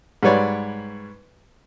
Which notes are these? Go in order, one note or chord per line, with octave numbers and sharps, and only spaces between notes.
G#2 G3 B4 C#5 D5